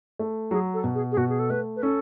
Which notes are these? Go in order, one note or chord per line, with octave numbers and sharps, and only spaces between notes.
A3
F#3 G#4
A4
B2
G#4
G#4
B2 F#4
G#4
A4
A3 B4
B4
C#4 A4